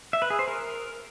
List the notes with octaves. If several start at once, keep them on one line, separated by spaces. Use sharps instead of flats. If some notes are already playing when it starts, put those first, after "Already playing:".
E5
B4
G#4
C5
A#4